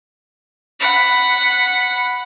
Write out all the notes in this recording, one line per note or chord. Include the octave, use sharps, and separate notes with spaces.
F#5 B5